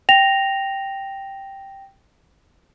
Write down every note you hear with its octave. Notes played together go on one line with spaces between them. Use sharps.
G5 A#6 F7